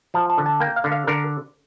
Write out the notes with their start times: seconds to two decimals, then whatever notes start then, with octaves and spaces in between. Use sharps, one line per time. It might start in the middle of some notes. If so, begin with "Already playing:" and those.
0.14 F3 A5
0.30 A5
0.38 D3
0.46 A5
0.60 A#3 G5
0.76 F5
0.84 D3
0.92 F5
1.07 D3 A#4